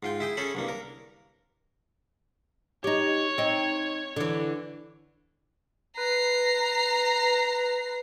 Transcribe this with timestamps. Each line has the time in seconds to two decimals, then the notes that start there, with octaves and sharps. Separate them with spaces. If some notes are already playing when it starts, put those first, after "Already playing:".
0.03 G#2 F4 G5
0.20 E4 G#4 G5
0.37 C#4 G#4 A4 C#5 B5
0.55 C2 G2 A#3
0.68 A#4
2.84 D#4 G4 C#5
3.38 C4 D#4
4.16 D3 E3
5.97 B4 A#5 C7